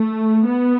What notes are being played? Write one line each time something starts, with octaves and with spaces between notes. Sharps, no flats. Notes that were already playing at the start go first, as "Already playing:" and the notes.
Already playing: A3
B3